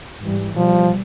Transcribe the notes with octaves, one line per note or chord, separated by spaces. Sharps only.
G#2 E3 G3
B2 F3 G3